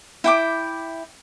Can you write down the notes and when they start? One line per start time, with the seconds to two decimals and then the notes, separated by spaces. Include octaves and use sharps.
0.24 E4 G5 D6